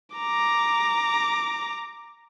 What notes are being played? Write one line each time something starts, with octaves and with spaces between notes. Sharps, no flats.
A#5 D6